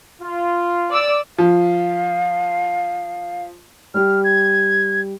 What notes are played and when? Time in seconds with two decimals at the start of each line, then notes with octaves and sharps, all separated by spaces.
0.22 F4
0.90 D5 E6
1.38 F3 F5
3.94 G3 G4 F6
4.24 G#6